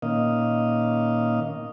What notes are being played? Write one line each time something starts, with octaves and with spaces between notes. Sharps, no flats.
A#2 D#3 A#3 C#4 D#5 F5